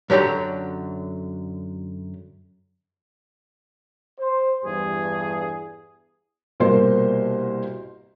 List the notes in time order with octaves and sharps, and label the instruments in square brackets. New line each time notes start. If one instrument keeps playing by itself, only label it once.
[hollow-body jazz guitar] F#2 D3 F#3 G4 A#5
[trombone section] C5
[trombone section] E2 G2 [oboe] G#4
[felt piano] C2 B2 A#3 A#4 C5 C6